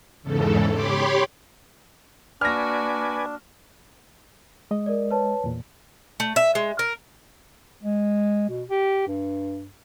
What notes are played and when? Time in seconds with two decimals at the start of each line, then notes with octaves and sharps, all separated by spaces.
0.23 E2 G#2 C#3 A4
0.72 G4 C#5 B5 C6 D6
2.41 A#3 D4 F#4 B4 D5 G#5 F6 A#6
4.71 G#3 D#5
4.86 A#4 D5
5.11 B4 C#5 A5
5.44 E2 A#2
6.20 A3
6.36 E5
6.55 G#3
6.79 A#4
7.83 G#3
8.49 B2
8.70 G4
9.08 G2